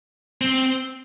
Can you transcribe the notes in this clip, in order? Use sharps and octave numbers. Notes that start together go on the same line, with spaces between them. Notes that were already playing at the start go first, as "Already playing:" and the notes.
C4